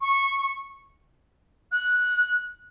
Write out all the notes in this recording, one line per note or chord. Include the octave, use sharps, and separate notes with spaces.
C#6
F#6